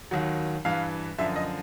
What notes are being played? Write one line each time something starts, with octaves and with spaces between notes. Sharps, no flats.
D#2 D#3 F#3
G2 E3 F5
F#2 D3 F3 E5
D#5